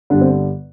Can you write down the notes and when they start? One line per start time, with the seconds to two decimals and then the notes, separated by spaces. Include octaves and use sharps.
0.10 G1 G2 D3 D4
0.21 C4